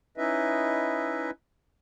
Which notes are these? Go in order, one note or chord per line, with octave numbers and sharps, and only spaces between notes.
C#4 D#4 E4 B4 D#5 E5